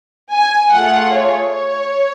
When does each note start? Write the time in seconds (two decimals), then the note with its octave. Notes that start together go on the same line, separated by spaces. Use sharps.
0.32 G#5
0.72 A3 F4 G#4 F#5
1.13 C#5
1.54 C#5